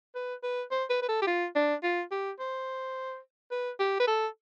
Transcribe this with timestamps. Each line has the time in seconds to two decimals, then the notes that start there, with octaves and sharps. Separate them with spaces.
0.15 B4
0.43 B4
0.71 C5
0.90 B4
1.02 B4
1.09 A4
1.22 G4
1.27 F4
1.55 D4
1.83 F4
2.11 G4
2.39 C5
3.51 B4
3.79 G4
4.00 B4
4.07 A4